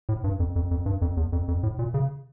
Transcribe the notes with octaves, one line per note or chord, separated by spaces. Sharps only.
A2
G2
F2
F2
F2
G2
F2
E2
F2
F2
A2
A#2
C#3